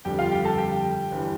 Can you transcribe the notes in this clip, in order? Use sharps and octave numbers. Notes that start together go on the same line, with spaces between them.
G1 F2 D3 G3 G4 G5
F4 F5
G4 G5
A4 A5
G4 G5
G1 E3 G3